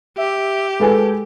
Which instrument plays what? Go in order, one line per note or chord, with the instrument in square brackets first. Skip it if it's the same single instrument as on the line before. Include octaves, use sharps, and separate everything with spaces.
[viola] G4 [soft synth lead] E5
[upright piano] G#3 B4 G#5 [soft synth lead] A4